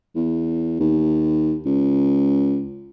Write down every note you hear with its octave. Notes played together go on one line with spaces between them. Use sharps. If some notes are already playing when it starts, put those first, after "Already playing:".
E2
D#2
C#2